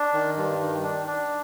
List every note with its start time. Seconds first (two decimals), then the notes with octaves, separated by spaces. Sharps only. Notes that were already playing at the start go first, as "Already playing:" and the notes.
Already playing: D4
0.13 D#3
0.36 G2
0.60 D#3
0.83 D4
1.07 D4